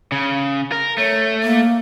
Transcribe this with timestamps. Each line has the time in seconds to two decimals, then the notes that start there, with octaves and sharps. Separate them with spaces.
0.12 C#3
0.72 A#4
0.98 A3 C#5
1.43 A#3